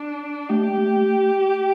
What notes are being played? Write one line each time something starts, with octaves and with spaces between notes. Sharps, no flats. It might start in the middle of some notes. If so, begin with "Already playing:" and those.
Already playing: D4
A3 G4
A3